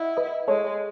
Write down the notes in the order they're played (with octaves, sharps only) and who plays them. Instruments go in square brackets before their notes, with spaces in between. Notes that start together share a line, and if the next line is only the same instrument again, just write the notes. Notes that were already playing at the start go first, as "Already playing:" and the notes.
Already playing: [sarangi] E4 [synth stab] D#5 F#5
[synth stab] B4 D#5
[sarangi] G#3 [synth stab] A4 C#5